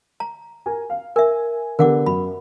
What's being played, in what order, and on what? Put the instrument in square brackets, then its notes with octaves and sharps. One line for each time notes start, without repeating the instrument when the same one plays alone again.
[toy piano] A#5
[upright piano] A#4 G#5
F5
[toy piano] A#4 E5 [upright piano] G#5
[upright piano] D3 B3 G4 [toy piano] A#4 F#5 D6
[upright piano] F#2 [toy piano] B5